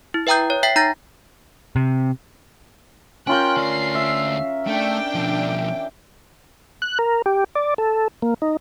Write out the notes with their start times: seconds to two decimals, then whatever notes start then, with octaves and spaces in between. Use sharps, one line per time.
0.14 E4
0.27 B4 E5 G5 A#5 D#6 G6
0.50 C#5
0.63 E5 G5 B6 C7
0.76 D#4 A#5 G6 A6 A#6
1.76 C3
3.27 C#4 F4 A#4 G5 F#6 G6
3.57 D2 D5 C7
3.95 E5
4.67 A3 D4 G5 D6
5.15 B2 F3
6.82 F#6
6.99 A#4
7.26 G4
7.55 D5
7.78 A4
8.22 A#3
8.42 D#4